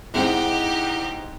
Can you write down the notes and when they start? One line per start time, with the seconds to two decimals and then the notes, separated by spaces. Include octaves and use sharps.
0.14 G#2 C4 D#4 E4 G4 G#4 F#5